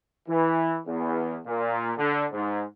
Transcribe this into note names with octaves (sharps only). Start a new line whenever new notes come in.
E3
E2
A#2
D3
G#2